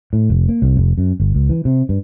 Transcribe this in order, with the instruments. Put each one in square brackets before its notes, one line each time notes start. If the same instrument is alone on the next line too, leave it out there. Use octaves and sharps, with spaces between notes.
[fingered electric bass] A2
F1
A#3
C2
F1
F#2
G1
C#2
E3
C3
G2